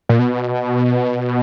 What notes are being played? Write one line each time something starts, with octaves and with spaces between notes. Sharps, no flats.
A#2
B2